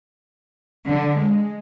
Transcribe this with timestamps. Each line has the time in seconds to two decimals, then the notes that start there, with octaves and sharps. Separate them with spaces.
0.88 D3
1.18 G#3